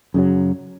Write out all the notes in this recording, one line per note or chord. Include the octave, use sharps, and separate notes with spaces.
F#2 C#3 F#3